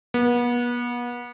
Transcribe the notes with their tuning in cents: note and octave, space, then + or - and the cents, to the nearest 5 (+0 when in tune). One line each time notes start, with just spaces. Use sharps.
B3 -35